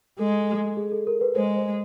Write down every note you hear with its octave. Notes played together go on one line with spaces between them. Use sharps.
G#3 A4
G#4
A4
A#4
B4
G#3 C5
C5